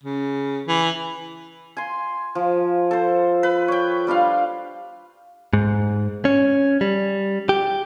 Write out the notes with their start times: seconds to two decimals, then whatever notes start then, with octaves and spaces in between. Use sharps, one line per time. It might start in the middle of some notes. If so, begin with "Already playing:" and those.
0.04 C#3
0.67 E3
1.77 G#5 C6
2.35 F3
2.91 A4 C5
3.43 B4
3.68 C#5 G5
4.07 G3 D4 F4 F5
5.53 G#2
6.25 C#4
6.81 G3
7.49 G4